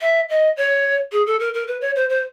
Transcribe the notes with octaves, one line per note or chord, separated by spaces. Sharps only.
E5
D#5
C#5
G#4
A4
A#4
A#4
B4
C#5
C5
C5